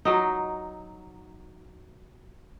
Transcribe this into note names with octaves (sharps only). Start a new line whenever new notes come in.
F#3 D#4